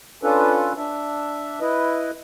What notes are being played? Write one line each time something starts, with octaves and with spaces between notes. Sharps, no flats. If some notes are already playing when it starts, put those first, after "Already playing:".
C#4 D4 F4 A4 B4
D4 E5
E4 B4 D#5